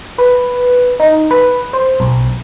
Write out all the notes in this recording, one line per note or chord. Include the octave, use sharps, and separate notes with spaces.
B4
D#4
B4
C5
B1